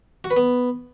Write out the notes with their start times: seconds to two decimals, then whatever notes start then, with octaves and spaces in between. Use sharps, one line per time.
0.24 F#4
0.31 B4
0.37 B3